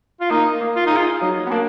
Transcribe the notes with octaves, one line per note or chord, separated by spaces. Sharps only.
F4
A#3 D#4
A#3
F4
D#4 G#4
F4
F#3 D#4
B3
A#3 D4